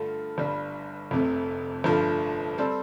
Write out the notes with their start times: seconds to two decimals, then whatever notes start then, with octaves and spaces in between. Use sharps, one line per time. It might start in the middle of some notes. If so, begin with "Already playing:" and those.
Already playing: G2 D3 A3 F4
0.38 G1 G2 G3
1.11 F1 F2 C3 A3
1.84 G1 G2 F3 A3
2.58 G3 C4 A4